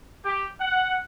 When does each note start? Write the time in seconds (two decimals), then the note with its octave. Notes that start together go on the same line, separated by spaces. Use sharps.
0.24 G4
0.61 F#5